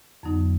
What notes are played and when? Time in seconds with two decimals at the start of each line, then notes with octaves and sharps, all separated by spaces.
0.23 F2 D3 F#3 B3 D#4